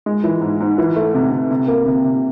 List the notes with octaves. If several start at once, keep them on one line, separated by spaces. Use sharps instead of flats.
G#3
E3
G#2
G#2
E3
A3
C3
C3
C3
A#3
C3
C3